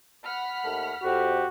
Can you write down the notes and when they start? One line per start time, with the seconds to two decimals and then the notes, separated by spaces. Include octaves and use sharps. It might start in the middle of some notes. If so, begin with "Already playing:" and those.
0.24 F#5 B5 F6
0.64 D#2 A3
1.04 F2 F#4 G4